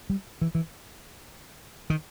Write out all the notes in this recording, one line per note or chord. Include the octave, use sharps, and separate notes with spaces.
G3
E3
E3
D#3